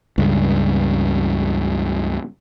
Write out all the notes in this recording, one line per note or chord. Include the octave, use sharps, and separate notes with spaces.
C#2 G2